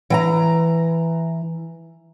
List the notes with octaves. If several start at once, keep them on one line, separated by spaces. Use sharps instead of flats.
E3 G5 A#5